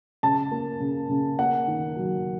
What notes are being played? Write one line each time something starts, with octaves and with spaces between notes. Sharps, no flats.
C#3 A5
A#3
C#3
C#3
A#3 F#5
D#3
F#3